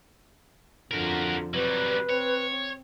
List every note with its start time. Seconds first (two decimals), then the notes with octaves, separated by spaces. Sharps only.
0.91 F2 D3 F3 F#4 A#4
1.54 C3 F#3 G3 B4
2.10 C4 C#5